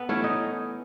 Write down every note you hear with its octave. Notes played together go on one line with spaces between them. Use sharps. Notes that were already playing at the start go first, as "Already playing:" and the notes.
Already playing: B3 A4 B4
E3 A3 C#4 E4 C#5
D#4 D#5